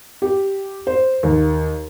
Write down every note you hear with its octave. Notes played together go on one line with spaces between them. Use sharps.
G4
C5
D#2